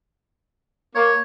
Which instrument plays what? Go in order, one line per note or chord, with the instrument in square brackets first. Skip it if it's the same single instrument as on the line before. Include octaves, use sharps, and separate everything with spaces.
[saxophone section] A#3 [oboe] C#5